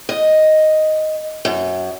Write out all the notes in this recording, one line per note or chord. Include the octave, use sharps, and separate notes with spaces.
D#5
F#2